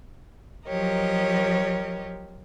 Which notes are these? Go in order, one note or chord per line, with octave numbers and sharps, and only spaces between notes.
F3 F#3 G4 A#4 C#5 D#5